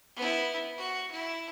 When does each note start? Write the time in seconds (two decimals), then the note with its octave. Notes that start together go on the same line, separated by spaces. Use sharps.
0.16 B3 E4
0.78 F#4
1.11 E4